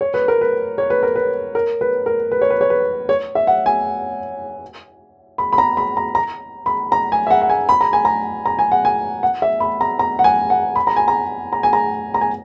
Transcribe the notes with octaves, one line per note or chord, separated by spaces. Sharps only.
C#5
B4
A#4
B4
C#5
B4
A#4
B4
A#4
B4
A#4
B4
C#5
B4
C#5
B4
C#5
E5
F#5
G#5
B5
B5
A#5
B5
A#5
A#5
B5
A#5
G#5
E5
F#5
F#5
G#5
B5
A#5
G#5
A#5
A#5
G#5
F#5
G#5
F#5
E5
B5
A#5
A#5
F#5
G#5
F#5
B5
A#5
G#5
A#5
A#5
G#5
A#5
A#5
G#5